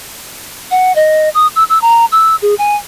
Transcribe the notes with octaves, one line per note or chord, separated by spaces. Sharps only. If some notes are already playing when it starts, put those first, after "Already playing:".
F#5
D#5
D#6
E6
E6
A#5
E6
G#4
G#5